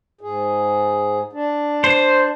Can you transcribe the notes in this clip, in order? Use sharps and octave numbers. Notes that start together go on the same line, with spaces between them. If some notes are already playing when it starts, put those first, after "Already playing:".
G#2 G#4
D4
C5